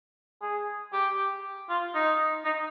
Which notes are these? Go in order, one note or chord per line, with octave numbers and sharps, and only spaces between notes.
G#4
G4
F4
D#4
D#4